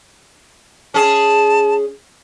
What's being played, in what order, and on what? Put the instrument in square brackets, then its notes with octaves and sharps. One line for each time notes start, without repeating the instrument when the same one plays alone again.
[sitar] C#4 G#4 [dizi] A5